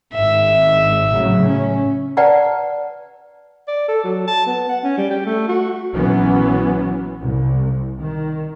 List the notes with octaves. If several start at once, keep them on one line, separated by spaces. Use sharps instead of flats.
G#1 G#2 E5
A2 C#3 F#3
C#4
B4 D5 F#5 A5 A#5
D5
A4
F#3
A5
B3
F#5
C#4
G3
G4
A3
F#4
A#1 E3 F#3 B3 C#4
C2
D#3